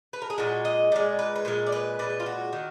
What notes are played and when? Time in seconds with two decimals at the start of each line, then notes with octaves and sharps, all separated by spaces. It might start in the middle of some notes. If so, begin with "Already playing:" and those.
0.13 B4
0.22 A#4
0.30 G#4
0.38 A#2 G#3 F#4
0.65 D#5
0.92 A#2 G#3 D5
1.19 B4
1.36 B4
1.45 A#2 G#3 A#4
1.66 D5
1.72 B4
1.99 A#2 G#3 B4
2.20 F4
2.26 F#4
2.53 D#3